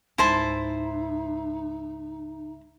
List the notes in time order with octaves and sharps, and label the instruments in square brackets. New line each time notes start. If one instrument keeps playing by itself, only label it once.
[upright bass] C#2 G#2 [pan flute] D#4 [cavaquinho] E4 C5 A5